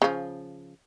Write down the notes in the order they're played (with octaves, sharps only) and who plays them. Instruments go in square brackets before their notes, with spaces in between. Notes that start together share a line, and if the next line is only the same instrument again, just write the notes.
[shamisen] C#3 F3